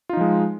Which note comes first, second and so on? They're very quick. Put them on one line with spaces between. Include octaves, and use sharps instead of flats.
F4 D#4 F3 G#3